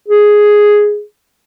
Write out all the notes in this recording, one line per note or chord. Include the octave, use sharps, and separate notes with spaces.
G#4